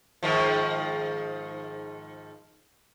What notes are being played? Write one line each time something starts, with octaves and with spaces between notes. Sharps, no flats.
G#2 D#3 F3